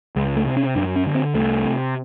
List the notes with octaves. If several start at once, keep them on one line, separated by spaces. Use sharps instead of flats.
C#2 G#3
A3
C3
C#4
F#2 D4
C#4
D3
C4
C2 A3
C3